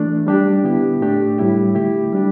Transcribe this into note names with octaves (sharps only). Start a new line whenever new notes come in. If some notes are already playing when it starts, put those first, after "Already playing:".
Already playing: E3 A3 D4
G3 D4 G4
D3 B3 E4 G4
A2 A3 D4 G4
A2 G3 E4 G4
D3 A3 E4 G4
G3 D4 G4